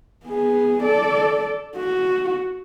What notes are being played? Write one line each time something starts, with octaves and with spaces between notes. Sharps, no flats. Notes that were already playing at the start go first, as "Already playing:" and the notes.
B3 G#4
A4 D5
F#4